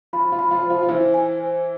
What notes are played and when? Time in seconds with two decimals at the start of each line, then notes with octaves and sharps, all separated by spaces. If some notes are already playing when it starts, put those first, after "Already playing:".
0.13 F3 F4 B5
0.32 F3 F4
0.39 B5
0.51 F3 F4
0.63 C5
0.70 F3 F4
0.83 F4
0.88 E3 E4 C5
1.14 G#5
1.40 C5